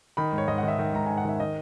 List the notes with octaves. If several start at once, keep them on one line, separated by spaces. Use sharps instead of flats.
D#3 B5
G#2
C#5
G#2 D#5
F#5
D#3
E5
D#3
G#2 A#5
G#2 G#5
F#5
D#3 E5
D#3 D#5